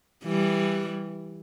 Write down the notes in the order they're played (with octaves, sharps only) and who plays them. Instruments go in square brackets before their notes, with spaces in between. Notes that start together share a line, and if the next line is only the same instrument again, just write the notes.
[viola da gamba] E3 G3